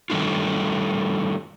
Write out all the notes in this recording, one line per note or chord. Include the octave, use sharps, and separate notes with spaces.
D#3 G3 A3 D4 F4